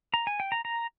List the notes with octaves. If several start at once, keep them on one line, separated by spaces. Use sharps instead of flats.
A#5
G#5
G5
A#5
A#5